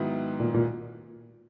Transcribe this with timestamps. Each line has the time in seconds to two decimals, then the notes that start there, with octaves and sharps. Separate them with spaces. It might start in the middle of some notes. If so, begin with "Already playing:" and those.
Already playing: G#2 D#3 F#3 B3 E4
0.40 A#2
0.54 A#2